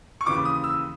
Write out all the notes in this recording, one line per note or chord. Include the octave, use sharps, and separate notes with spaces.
C#6
D#2 C#3 E3 D6
D#6
E6